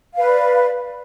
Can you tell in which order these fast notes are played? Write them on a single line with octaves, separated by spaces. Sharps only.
F5 B4 D5